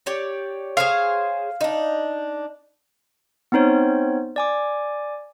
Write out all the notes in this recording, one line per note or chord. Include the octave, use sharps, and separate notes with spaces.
G4 C#5 D5
G#4 C5 C#5 F5
D4 D#4
B3 C4 D#4 C5 C#5
D5 G#5 D6